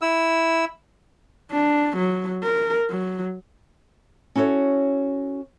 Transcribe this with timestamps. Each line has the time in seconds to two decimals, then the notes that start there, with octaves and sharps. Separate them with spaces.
0.02 E4 E6
1.51 D4
1.97 F#3
2.43 A#4
2.91 F#3
4.35 C#4 E4 F#4 A4 C#5